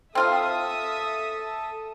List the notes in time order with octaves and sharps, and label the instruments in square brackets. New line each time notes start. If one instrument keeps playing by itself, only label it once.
[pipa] C4 F4 F5 [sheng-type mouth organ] A4 [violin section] E5 D#6